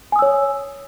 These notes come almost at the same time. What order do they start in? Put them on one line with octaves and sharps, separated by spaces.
G#5 D#6 E6 C#5